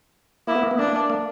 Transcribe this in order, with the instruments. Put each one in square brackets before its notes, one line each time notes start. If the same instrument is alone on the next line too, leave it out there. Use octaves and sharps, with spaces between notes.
[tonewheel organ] A#3 [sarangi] E4
[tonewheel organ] B3
A#3
B3
[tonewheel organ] A#3 [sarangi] D4
[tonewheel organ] A#3